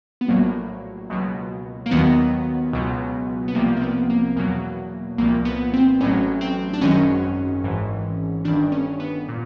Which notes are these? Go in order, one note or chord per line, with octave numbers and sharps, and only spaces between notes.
B3
A#1 A2 F#3 A#3
C#2 B2 F#3
A#3
D#2 D#3 F#3 B3
C#2 B2 F#3
B3
C2 C3 F3 A#3
C4
B3
A#3
E2 B2 F#3 A#3
C2 A#2 F3 A#3
B3
C4
A1 A2 F#3 C#4
C4
D4
G#1 F#2 D#3 F#3 C#4
G#1 G#2 E3
G1 G2 D#3 D4
C#4
B3
A#2